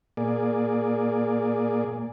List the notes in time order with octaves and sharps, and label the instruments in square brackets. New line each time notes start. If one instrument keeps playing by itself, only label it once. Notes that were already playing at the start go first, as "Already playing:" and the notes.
[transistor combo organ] A#2 A#3 G#4 D5